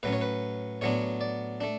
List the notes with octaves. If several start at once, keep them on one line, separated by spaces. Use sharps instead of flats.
A2 F#3 C#4 B4
C#5
B4
A2 F#3 B3 D4 C#5
D5
A3 D4